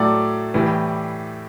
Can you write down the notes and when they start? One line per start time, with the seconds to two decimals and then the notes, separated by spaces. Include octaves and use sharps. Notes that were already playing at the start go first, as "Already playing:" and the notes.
Already playing: A2 F#3 A3 D5
0.54 A2 E3 G3